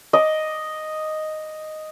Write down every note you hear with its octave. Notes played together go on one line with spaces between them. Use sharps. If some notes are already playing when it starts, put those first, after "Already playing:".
D#5 D6